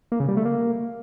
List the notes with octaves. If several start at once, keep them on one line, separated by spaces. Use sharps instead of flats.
A#3
C#3
G3
A3
A#3